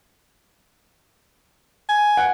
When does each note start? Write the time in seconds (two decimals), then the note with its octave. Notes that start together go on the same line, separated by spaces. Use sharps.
1.89 G#5
2.17 F#5